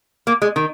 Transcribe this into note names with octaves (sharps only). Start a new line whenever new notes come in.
A#3
G#3
D#3